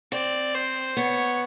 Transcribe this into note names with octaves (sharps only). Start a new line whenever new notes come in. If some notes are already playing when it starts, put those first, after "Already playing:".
C4 D5
C5
B3 C#5